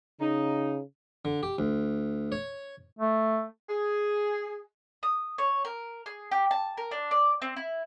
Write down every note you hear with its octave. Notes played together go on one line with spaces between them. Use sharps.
C#3 D#4
D3
G4
D2
C#5
A3
G#4
D#6
C#5
A#4
G#4
G4
A5
A#4
D4
D5
C4
E4